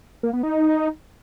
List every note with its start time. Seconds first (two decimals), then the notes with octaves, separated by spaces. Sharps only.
0.23 A#3
0.33 B3
0.43 D#4